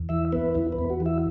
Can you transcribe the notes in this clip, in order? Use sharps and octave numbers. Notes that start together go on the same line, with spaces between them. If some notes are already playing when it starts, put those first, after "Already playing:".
Already playing: E2
E3 E5
B3 B4
E2 E4
B4
E2
F#4
E3
E5